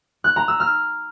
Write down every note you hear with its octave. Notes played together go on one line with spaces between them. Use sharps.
F#6
A#5
E6
F6